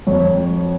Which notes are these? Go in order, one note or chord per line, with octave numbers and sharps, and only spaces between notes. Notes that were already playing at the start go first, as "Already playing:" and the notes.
F2 C#5